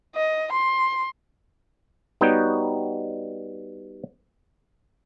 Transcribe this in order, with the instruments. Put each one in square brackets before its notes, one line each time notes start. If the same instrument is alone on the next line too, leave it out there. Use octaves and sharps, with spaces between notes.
[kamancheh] D#5
C6
[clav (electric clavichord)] G3 B3 D#4 F#4 C#5 G5